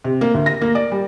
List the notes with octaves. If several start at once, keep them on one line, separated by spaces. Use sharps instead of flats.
C3
A#3
D2
A#6
A#3
D5
G3